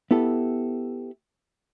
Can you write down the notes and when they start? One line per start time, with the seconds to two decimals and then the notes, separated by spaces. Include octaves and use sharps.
0.11 B3 E4 G4 A4